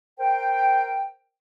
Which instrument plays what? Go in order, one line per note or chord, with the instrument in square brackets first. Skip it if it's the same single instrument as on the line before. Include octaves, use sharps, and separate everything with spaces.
[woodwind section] A#4 C5 G5